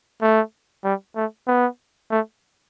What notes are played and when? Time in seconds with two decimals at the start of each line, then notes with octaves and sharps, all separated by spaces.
0.22 A3
0.84 G3
1.15 A3
1.47 B3
2.10 A3